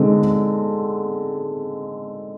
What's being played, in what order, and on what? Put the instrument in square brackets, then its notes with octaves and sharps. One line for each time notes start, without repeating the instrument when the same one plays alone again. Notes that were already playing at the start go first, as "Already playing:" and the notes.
Already playing: [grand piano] D3 G#3 C4 D#4